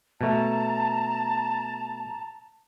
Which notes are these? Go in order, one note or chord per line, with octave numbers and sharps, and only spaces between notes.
B2 A3 A5 A#5